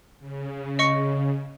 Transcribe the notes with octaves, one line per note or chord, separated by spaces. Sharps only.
C#3
D#5 C#6 C#7